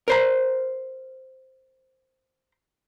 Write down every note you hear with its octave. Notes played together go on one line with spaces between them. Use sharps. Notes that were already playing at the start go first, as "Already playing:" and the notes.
A#4 C5 A#5